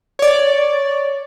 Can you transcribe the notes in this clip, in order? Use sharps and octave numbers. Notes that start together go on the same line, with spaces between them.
C#5 D5